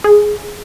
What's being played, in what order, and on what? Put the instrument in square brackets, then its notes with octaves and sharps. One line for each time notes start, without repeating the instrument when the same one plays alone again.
[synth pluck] G#4